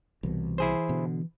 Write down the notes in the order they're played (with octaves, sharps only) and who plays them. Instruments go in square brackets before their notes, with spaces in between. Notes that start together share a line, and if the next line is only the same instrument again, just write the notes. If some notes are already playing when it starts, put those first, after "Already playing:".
[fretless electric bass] C2 B2 [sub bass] E3
[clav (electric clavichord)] E4 G#4 C5
[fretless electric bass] B2 D3